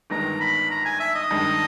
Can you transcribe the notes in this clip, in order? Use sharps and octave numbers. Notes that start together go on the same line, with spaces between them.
G1 G2 D#3 G#3 B3 A#5
B5
A#5
G#5
E5
D#5
G2 D#3 G#3